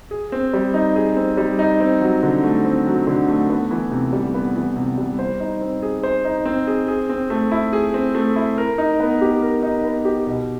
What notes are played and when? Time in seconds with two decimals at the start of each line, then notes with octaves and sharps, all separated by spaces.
0.11 G#4
0.32 C4
0.53 G3
0.74 D#4
0.96 G#4
1.17 C4
1.37 G3
1.59 D#4
1.80 C4
2.01 F#3
2.23 D3
2.44 A3
2.65 C4
2.86 F#3
3.07 D3
3.29 A3
3.50 B3
3.71 E3
3.92 C3
4.13 G3
4.34 B3
4.55 E3
4.76 C3
4.98 G3
5.19 C5
5.40 D#4
5.61 C4
5.83 G#4
6.03 C5
6.25 D#4
6.45 C4
6.67 G#4
6.88 G#4
7.09 C4
7.30 A3
7.52 E4
7.73 G#4
7.94 C4
8.15 A3
8.36 E4
8.58 A#4
8.78 D#4
9.00 B3
9.21 G4
9.42 A#4
9.63 D#4
9.84 B3
10.05 G4
10.27 B2